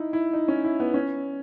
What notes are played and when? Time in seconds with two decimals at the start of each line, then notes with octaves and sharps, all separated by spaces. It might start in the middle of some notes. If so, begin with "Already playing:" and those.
Already playing: D#4 E4
0.13 E4
0.33 D#4
0.48 C#4
0.64 E4
0.80 B3
0.94 C#4